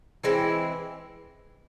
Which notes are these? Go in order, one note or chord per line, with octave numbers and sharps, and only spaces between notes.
E3 G#3 C4 E4